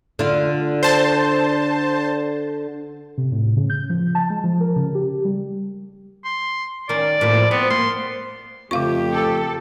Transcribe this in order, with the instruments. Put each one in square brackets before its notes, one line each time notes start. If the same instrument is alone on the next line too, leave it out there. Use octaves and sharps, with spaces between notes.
[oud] D3 F4
[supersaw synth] C5 A5
[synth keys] C3
A2
C#3
G6
F3
A5
G#3
F3
A#4
C#3
G4
G3
[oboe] C6
[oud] D#3 C#4 A#4 [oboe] D5
[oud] A2 F3 A#3
[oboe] B3 [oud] C4
[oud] A#3 [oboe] C6
[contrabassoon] F2 [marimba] C#3 F5 C#6 [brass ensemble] F3 A3 G4
[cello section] A4